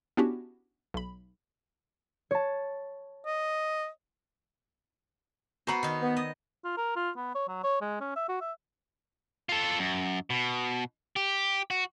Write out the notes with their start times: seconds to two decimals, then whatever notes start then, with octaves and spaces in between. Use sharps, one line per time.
0.17 B3 C#4 D4 E4 F#4 G4
0.94 B1 B5
2.31 C#5 A5
3.26 D#5
5.67 B3 F#4 C5 A#5 B5
5.83 D#3 D#4
6.01 B3
6.17 D#5
6.64 F4
6.77 A#4
6.96 F4
7.16 B3
7.35 C#5
7.48 F#3
7.64 C#5
7.81 G#3
8.01 C#4
8.16 E5
8.29 F#4
8.41 E5
9.49 F4 A4
9.79 F#2
10.30 B2
11.16 G4
11.70 F#4